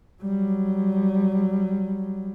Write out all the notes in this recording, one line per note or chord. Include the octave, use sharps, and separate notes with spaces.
F#3 G3